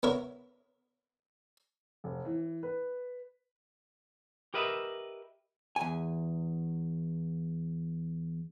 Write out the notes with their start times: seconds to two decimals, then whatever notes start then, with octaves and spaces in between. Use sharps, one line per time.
0.03 B3 E4 A#4 C#5
2.04 F1
2.25 E3
2.63 B4
4.54 G4 A#4 B4 D#5 E5
5.76 E2 G#5